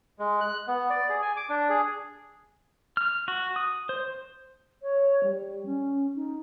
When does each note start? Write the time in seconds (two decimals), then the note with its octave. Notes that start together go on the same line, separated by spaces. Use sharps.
0.19 G#3
0.41 F#6
0.68 B3
0.90 D5
1.09 G#4
1.22 G#5
1.37 D6
1.49 D4
1.69 G#4
2.97 F6
3.28 F#4
3.56 D#6
3.89 C5
4.82 C#5
5.23 G3
5.66 C#4
6.15 D#4